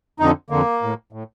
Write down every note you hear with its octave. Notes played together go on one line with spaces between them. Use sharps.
F2 D3 D#4
F2 D3 A#3
A2
A2